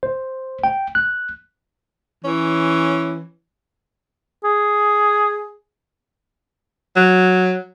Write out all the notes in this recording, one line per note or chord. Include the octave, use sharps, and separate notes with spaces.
C5
G5
F#6
E3 C#4
G#4
F#3